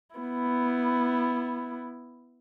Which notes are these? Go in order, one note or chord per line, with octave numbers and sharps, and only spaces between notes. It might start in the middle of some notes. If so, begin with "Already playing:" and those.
B3 E4